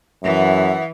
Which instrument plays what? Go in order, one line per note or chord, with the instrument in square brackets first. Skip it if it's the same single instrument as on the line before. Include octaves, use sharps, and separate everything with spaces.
[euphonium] F#2 [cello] E3 [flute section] E5 F#5 D#6